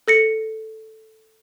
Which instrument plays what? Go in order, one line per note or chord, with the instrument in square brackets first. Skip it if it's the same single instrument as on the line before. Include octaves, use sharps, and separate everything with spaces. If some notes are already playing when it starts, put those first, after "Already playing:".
[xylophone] A4 A#6 C#7